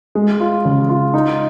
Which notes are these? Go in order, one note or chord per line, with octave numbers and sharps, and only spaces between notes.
G#3
F4
C#3
F4
D#4